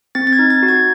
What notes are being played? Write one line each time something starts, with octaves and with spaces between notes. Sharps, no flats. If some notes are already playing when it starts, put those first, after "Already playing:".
C4 A6
A6
G#6
D#4
A6
F#4
G#6